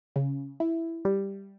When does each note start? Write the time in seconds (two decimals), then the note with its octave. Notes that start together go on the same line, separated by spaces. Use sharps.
0.16 C#3
0.60 E4
1.05 G3